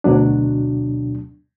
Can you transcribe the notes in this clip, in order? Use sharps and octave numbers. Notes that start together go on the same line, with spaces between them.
D2 B2 F#3 D4